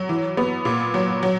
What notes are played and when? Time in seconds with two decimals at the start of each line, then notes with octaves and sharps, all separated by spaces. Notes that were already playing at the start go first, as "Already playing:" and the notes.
Already playing: F#3
0.09 E3
0.37 B3
0.65 A#2
0.94 F#3
1.23 F#3